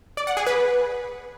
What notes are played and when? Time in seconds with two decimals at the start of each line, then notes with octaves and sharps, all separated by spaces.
0.17 D5
0.27 F#5
0.37 G#4
0.47 B4